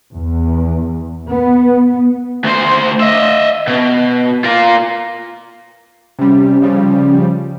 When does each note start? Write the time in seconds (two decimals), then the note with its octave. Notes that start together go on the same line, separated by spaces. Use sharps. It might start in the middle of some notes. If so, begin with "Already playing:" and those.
0.13 E2
1.30 B3
2.44 D2 C5
3.00 D#5 E5
3.67 B2
4.44 F4 A#4
6.19 C3 G3 C#4
6.62 C#3 F3 G3